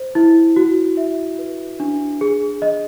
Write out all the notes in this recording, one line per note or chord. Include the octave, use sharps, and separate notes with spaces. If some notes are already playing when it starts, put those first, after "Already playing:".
Already playing: C5
E4
F#4
E5
B4
D4
G#4
D#5